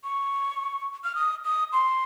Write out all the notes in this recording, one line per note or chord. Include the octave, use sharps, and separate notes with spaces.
C#6
F6
D#6
D#6
C6